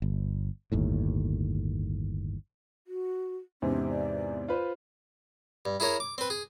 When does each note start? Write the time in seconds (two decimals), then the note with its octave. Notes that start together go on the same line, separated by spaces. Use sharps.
0.02 G1
0.72 G1 D#2 A2
2.87 F#4
3.62 E2 G#2 C3 C#4
3.89 D5
4.48 F4 B4 C5
5.65 G2
5.80 E4 G#4 A#4 C#5
6.00 D6
6.18 C4 B4
6.30 G#4